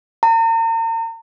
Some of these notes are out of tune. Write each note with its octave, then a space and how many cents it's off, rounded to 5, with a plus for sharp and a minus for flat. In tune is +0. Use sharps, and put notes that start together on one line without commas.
A#5 -40